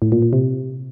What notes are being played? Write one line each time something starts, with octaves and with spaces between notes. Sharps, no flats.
A2
A#2
A#2
C3